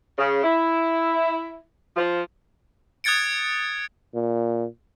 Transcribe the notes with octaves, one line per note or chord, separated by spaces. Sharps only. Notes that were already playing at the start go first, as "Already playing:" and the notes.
C#3
E4
F3
D#6 F#6 G#6 A6 C#7 D7
A#2